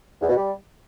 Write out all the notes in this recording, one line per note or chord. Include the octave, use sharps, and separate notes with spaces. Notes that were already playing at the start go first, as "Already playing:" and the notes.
E2
B2
G3